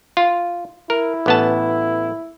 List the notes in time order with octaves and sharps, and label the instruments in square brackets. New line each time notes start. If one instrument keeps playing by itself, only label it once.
[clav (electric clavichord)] F4
[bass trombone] E4 [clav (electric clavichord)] A#4
[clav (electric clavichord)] A1 B3 A5